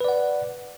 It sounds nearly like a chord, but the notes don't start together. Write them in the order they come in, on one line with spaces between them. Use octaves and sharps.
B4 D5 F#5